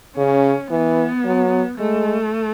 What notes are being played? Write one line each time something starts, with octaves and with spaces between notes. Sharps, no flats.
C#3 C#4
E3 B3
F#3
G#3 A3